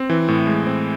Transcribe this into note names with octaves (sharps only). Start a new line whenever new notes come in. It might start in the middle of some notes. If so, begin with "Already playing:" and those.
Already playing: C4
E3
A2
G#3
C4